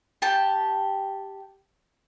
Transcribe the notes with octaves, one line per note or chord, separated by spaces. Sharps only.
G4 A5